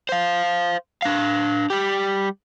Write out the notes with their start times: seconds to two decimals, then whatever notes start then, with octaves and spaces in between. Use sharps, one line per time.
0.09 C5 F5
1.02 D4 F5
1.70 G3 G4